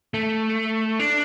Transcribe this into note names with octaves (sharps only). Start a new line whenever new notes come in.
A3
D4